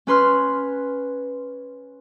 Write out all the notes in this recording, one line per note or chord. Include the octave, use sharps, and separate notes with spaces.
C#4 B4 C6 F6